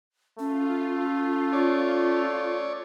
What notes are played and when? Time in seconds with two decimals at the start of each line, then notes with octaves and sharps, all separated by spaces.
0.39 A3 C#4 F4
1.53 C#5 D5